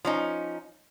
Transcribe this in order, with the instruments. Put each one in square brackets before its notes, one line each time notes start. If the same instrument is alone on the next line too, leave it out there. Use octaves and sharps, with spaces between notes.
[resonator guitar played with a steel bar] F3 C#4 D#4